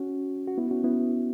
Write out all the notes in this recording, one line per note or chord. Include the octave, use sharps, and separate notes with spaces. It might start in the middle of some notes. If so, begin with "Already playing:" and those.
Already playing: C#4 F#4
F#4
B3 E4
C#4 F#4
B3 E4